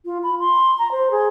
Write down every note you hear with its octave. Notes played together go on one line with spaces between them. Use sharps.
F4
B5
C6
A#5
C5
G#4